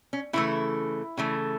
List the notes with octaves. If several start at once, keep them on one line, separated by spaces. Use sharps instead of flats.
C#4
C#3 E3 A3 E4
C#3 E3 A3